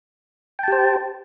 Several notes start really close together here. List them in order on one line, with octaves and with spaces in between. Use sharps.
G5 A5 G4 C5